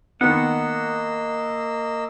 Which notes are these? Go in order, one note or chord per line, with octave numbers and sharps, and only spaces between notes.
D#3 A#3 B3 D#5 F#5 E6